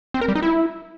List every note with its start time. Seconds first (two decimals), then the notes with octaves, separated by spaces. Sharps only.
0.14 C4
0.21 A#4
0.28 G3
0.35 D#4
0.43 E4